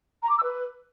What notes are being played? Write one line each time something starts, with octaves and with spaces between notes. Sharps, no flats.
A#5
D6
E6
B4